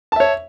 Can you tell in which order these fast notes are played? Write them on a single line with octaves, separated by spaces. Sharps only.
A5 E5 C#5